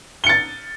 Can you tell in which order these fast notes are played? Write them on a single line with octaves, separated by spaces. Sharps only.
G7 C#7 A6